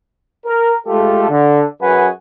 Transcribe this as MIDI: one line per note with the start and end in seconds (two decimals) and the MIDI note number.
0.46 0.71 70
0.87 1.28 56
0.87 1.28 57
0.87 1.28 65
0.87 1.28 67
0.87 1.28 69
1.28 1.61 50
1.81 2.08 42
1.81 2.08 66
1.81 2.08 68
1.81 2.08 71
1.81 2.08 78
1.81 2.08 80